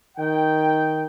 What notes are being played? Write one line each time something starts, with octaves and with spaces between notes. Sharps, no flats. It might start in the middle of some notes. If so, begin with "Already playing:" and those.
D#3 G5